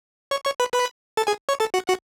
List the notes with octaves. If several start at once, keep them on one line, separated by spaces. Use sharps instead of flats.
C#5 C#6
C#5 C#6
B4 B5
B4 B5
A4 A5
G#4 G#5
C#5 C#6
A4 A5
F#4 F#5
F#4 F#5